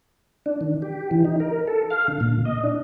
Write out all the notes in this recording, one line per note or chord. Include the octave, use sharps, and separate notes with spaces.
D4
D#3
G4
E3
D#4
A#4
A4
F5
D3
A#2
D#5
D4